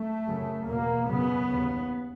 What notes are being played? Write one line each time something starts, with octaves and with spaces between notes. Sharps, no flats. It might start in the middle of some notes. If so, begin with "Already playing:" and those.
Already playing: A3
F#2 C#3
E2 B2 A#3
F#2 C#3 B3
D#2 C#3